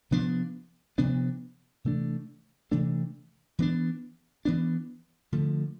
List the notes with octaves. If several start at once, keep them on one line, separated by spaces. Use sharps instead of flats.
C3 F3 B3 D4
C3 F3 B3 D4
C3 E3 A3 D4
C3 E3 A3 D4
E3 B3 D4
E3 B3 D4
D3 F3 A3